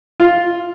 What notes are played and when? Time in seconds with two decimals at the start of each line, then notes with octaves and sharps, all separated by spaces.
0.20 F4